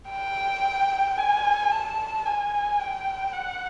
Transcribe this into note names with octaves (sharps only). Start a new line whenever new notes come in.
G5
G#5
A5
G#5
G5
F#5